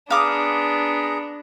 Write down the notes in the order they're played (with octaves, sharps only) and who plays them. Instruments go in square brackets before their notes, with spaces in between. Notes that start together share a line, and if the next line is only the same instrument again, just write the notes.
[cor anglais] B3 [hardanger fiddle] D4 [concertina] G#4 A#5 [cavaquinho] F5 D6 D#6